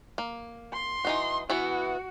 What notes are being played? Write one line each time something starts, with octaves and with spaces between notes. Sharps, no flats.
A#3
C6
E3 D#4 F#4
E3 B3 E4 F#4